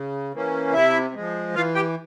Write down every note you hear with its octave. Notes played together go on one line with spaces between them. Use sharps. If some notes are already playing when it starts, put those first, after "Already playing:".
Already playing: C#3
E3 A#3 C#4
C3 E4 E5
F3 G#3
E3 F4 F5
G4 G5